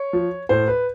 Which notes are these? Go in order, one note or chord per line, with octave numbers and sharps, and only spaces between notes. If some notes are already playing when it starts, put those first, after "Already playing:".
Already playing: C#5
F3
A2 C5
B4